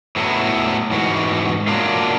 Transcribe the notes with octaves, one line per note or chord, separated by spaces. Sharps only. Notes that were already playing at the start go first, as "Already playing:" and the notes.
A2 F#3 B3 E4
G#2 E3 F#4
F#3 A#3 D4 F4